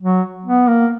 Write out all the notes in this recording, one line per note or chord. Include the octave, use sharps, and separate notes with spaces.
F#3
B3
A#3